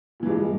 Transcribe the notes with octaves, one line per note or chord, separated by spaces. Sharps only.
G2 A#2 E3 G#3